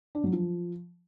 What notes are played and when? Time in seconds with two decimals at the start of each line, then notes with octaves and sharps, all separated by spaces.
0.15 D4
0.24 F#3
0.33 F3